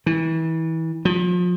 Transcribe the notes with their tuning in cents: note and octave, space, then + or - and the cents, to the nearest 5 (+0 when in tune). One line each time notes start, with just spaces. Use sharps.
E3 -30
F3 +35